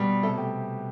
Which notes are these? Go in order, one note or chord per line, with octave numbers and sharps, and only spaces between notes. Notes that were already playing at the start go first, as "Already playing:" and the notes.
Already playing: B2 G3
C3 A3 A4
G4